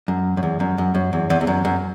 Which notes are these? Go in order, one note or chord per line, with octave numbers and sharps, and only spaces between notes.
F#2
F#2
E2
F#2
F#2
F#2
E2
E2
E2
F#2
F#2